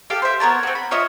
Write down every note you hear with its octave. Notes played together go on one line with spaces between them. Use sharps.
G4 A4 F5
C5 E5
B3 A#4 C#5 A5
C4 F#4
B5
F4 C#5 D#5 E5